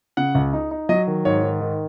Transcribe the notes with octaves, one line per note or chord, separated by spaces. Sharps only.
C#3 F#5
C#2
D#4
D#4
F#3 D#5
D#3
G#2 C#5
D#3
D#3